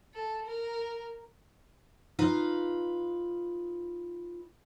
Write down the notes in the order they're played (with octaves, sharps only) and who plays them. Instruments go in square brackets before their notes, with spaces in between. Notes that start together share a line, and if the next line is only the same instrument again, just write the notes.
[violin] A4
A#4
[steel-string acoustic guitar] D#4 F4 B4 F5